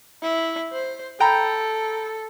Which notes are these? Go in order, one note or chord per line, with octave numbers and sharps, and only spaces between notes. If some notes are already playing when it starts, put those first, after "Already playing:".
E4
C5
A4 G5 A#5 B5